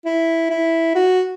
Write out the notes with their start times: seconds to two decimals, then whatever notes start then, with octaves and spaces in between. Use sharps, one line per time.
0.05 E4
0.50 E4
0.95 F#4